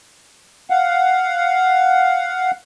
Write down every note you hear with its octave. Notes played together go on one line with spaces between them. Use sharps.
F5 F#5